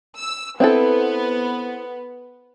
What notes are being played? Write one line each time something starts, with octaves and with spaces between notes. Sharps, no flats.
E6
B3 C4 E4 A4